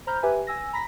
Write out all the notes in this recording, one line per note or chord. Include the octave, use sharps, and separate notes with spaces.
C5 A#5 B5 F6 G6
G4 B4 E5 G#5
G#5 E6 A#6
A#5 B5 A#6 B6